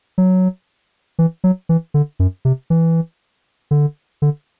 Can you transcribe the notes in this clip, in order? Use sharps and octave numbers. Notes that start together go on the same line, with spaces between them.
F#3
E3
F#3
E3
D3
F#2
C3
E3
D3
D3